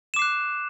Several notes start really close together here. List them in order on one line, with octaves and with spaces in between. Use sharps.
E7 D6 C7 F#6